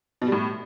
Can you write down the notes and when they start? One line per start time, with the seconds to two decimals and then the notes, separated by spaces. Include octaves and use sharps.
0.22 B2
0.27 G3
0.32 A2